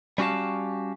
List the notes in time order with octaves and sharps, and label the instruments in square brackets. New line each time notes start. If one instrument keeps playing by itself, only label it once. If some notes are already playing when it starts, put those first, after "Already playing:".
[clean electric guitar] G3 C#4 F#4 G4 F5 A5